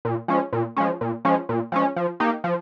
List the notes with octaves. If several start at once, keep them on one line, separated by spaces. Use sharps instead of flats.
A#2
F3 G#3 C#4
A#2
F3 G#3 C#4
A#2
F3 G#3 C#4
A#2
F3 G#3 C#4
F3
A#3 D#4 G4
F3